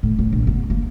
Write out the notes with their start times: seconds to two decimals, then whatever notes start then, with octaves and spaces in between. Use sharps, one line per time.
0.03 A2
0.19 A2
0.32 A#1
0.47 B3
0.70 A#3